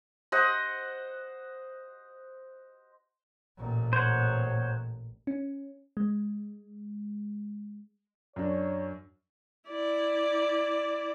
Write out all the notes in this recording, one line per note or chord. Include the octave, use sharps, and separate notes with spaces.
C5 D#5 F#5
A1 A#2
C5 C#5 F#5
C#4
G#3
F#2 D4 C#5
E4 D5